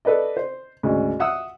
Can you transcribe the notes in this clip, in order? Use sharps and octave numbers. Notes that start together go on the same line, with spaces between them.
A4 B4 D5 D#5
C5
D2 G#2 C#3
E5 F#5 D#6 E6